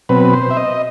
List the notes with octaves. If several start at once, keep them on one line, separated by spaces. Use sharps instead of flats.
B2 F#3 C4 B4
C5
E5
D#5